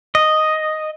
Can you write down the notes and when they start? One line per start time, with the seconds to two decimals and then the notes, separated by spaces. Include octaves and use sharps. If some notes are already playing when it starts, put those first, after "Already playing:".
0.15 D#5